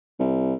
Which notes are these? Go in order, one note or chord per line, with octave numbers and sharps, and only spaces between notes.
C2